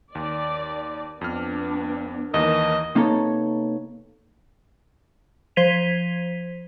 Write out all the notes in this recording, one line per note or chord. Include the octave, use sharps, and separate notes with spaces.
D#2 D5
F2 B3 D4 F6
D#2 E3 A#3 A#4 D#5
C3 A#3 B3 D#4 A4 C#5
F3 C5 G#6 B6 D#7 F7